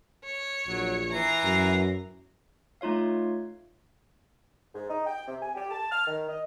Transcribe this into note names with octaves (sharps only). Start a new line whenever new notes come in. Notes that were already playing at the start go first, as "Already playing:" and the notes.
C#5
A#1 F#3
E3 A#5 C7
F#2
A3 D#4 F4 C#5 F5
G#2
D#4
G5
C3
G#5
G4
A5
F6
D#3
D#5